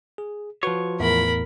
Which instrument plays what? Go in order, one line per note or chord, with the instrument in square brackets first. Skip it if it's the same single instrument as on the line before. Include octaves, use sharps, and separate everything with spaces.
[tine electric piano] G#4
[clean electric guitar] F3 C#5 [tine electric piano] F#4 B4
[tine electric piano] E2 A2 [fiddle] A#4 B5